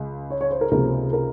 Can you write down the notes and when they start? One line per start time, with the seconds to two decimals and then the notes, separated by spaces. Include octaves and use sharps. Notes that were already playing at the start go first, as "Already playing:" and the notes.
Already playing: C#2
0.30 C#5
0.41 C#5
0.51 C5
0.61 A#4
0.71 C#2 C3 F3 A#3 A#4
1.13 A#4